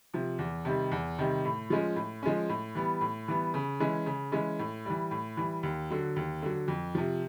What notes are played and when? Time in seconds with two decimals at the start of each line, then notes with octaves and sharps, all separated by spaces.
0.14 C3 F3
0.39 E2
0.65 C3 D#3 G3
0.92 E2
1.19 C3 D#3 G3
1.45 A2
1.70 F3 G#3 C#4
1.96 A2
2.23 F3 G#3 C#4
2.49 A2
2.75 E3 G3 B3
3.01 A2
3.28 E3 G3 B3
3.54 C#3
3.80 E3 G#3 C#4
4.06 C#3
4.32 E3 G#3 C#4
4.59 A2
4.85 E3 G3
5.11 A2
5.37 E3 G3
5.63 D#2
5.90 D3 F#3
6.16 D#2
6.42 D3 F#3
6.68 F2
6.95 C3 F3